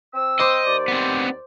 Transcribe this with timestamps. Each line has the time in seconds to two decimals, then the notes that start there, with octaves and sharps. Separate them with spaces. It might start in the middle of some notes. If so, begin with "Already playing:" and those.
0.13 C4 E6
0.39 C5 D#5 C6 D6
0.65 D#2 D5
0.88 B3 C4